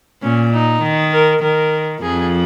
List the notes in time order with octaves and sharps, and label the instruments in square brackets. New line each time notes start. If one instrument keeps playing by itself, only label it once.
[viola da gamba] A#2 [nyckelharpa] C#4
[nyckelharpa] D#4
[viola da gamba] D#3
[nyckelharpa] A#4
[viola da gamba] D#3 [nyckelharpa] A#4
[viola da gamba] F2 F3 [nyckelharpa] G#4